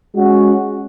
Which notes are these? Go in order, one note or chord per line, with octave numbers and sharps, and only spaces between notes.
G#3 C#4 F#4